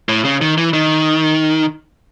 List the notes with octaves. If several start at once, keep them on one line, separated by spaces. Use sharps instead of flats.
A2
C#3
D#3
E3
D#3